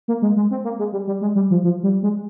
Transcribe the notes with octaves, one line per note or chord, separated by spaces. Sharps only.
A#3
G#3
G#3
C4
A#3
G#3
G3
G3
G#3
G3
F3
F3
G3
G#3